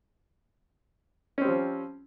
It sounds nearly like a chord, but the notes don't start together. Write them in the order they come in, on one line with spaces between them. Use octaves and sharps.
C#4 C4 G3 F3